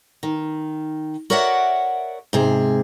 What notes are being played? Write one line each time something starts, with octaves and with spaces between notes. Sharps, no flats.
D#3
F#4 A#4 C#5 D5 E5 F#5
G#2 C3 G#4